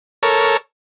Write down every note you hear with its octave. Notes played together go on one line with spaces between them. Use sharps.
A4 A#4 C#5